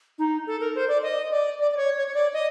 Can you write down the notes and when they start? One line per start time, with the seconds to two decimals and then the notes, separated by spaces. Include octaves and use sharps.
0.19 D#4
0.47 A4
0.60 A#4
0.75 C5
0.88 D5
1.03 D#5
1.31 D5
1.59 D5
1.71 D5
1.77 C#5
1.97 C#5
2.08 C#5
2.14 D5
2.33 D#5